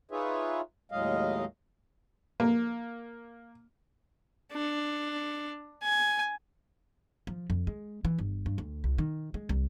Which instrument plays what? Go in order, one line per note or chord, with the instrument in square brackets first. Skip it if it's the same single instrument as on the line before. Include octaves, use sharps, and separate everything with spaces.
[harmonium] D#4 F4 G#4 B4 C#5 E5
D#2 A2 F#3 G#3 D#5 F5
[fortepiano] A#3
[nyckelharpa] D4
G#5
[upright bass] F3
F2
G#3
E3
G1
G2
D2
C2
D#3
G#3
C2